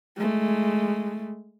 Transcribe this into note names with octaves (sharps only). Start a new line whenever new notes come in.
G#3 A3